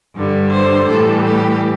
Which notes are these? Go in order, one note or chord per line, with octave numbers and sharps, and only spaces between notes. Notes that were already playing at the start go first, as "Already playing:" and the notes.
G2 D3 G3
C5
A2 E3 G3 A4
G4